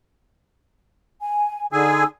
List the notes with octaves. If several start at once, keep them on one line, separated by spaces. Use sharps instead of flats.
G#5
D3 D#4 G#4 G#5 E6